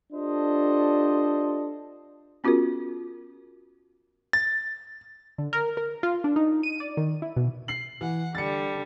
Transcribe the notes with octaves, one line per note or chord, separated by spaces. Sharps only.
D4 F4 G4 A4 C5 D#5
B3 C#4 F4 F#4 G#4 A#4
A6
D3
A#4
A#4
F4
D4
D#4
D#7
D5
D#3
E4
B2
C7 F#7
E3 F#5
D3 G3 A6 C#7